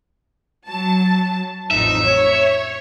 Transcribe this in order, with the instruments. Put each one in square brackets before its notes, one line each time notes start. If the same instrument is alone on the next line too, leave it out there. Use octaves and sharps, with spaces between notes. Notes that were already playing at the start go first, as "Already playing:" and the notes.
[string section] F#3 A5
[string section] A1 F2 D#4 [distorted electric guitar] E5
[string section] C#5